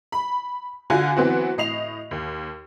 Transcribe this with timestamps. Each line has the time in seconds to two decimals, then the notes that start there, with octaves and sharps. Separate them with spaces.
0.12 B5
0.90 D3 F4 F#4 G#5
1.16 E3 F#3 B3 C4 F#4
1.58 A2 D#5 C7 F7
2.11 D#2